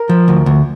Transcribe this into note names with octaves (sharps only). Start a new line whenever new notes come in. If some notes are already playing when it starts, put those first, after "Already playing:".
Already playing: A#4
F3
D2
D2